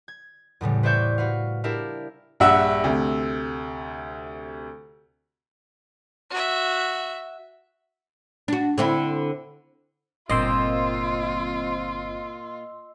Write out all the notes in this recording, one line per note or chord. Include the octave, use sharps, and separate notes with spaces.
G#6
E2 A2 C#3 G3
B4 C5 D5 E5 C#6 G6
F#4 B4 F5
D4 E4 G4 A#4 E5 F5
A#1 G2 E5 F#5 E6
D2 C3
F#4 E5
D4 F#4
D3 C4 E4
G1 A#2 C4 F4 D#5 C6 E6